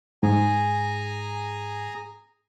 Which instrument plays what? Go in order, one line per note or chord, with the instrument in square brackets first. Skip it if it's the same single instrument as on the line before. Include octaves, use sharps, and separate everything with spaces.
[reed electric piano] G#2 [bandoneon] G#4 G#5 A#5